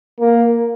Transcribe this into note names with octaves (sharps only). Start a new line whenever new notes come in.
A#3